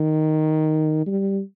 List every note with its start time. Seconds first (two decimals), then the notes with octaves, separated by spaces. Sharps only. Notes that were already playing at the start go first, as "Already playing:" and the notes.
Already playing: D#3
1.07 G3